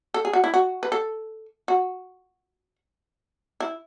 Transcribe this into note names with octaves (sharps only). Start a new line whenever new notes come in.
A4
G#4
F#4
E4
F#4
B4
A4
F#4
E4